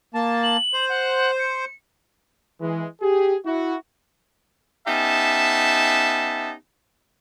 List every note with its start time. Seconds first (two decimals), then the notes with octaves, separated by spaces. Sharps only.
0.14 A#3 A5
0.43 F#7
0.73 C5
0.89 F#5
1.39 C#7
2.61 E3 G#3
3.01 G4 G#4
3.45 E4 F#4
4.87 B3 C#4 D#4 G4 E5 A5